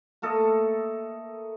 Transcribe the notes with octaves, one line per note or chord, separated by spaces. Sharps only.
A3 A#3 A4 D#5